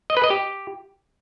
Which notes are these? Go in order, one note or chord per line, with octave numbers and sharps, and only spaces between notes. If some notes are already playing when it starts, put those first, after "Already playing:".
D#5
B4
D#5
G4